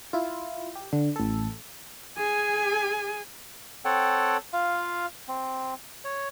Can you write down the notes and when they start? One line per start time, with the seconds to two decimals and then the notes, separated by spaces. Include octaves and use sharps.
0.13 E4 F4
0.76 G4
0.93 D3
1.16 A1 A4
2.18 G#4 G#5
3.85 C4 A4 C#5 F#5 G5 A5
4.53 F4 F5
5.28 C4
6.05 C#5